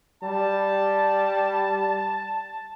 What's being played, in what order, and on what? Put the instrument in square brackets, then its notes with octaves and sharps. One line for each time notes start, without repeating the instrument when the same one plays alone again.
[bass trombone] G3 [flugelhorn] A5